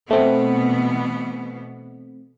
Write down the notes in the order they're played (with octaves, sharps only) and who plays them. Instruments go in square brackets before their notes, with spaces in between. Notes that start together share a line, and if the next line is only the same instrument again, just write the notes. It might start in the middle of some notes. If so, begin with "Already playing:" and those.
[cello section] B2 E3 B3 [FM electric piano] A3 C4